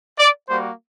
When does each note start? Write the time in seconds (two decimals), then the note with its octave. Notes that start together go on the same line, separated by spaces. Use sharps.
0.19 D5
0.49 G3 A#3 F#4 C5